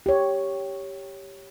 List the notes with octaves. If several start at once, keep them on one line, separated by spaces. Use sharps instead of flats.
G4 C#5